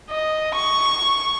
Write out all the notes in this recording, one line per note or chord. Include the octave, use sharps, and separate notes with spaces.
D#5
C#6